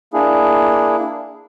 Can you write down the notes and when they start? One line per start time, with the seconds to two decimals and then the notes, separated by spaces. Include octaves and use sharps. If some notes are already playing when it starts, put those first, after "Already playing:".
0.13 A#3 D4 E4 G#4